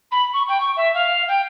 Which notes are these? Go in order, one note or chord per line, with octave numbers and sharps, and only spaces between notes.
B5
C#6
G5
C#6
E5
F5
G5